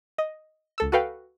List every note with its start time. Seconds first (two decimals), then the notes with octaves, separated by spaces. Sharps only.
0.18 D#5
0.78 C#2 A4 E6
0.92 F#4 A4 B4 F5 G5